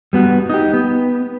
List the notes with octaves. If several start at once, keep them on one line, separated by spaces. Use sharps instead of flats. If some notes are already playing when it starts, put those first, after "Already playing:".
G3 B3 F#4
D#4 G4
B3